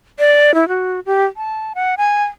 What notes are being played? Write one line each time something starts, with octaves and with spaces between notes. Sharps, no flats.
D5
E4
F#4
G4
A5
F#5
G#5